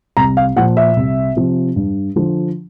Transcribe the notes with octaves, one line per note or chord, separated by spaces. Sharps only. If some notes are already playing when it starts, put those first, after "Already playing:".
C2 A#5
F5
A#2 F3 F#5
E5
C2
C3 F3
G2
D3 F3